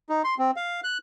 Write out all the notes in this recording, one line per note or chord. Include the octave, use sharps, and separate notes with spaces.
D#4
C6
C4
F5
F#6